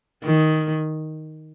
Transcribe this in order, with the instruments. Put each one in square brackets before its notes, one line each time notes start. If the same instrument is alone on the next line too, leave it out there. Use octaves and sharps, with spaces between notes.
[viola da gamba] D#3